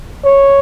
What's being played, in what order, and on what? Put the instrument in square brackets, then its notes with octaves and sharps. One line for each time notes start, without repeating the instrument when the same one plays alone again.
[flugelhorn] C#5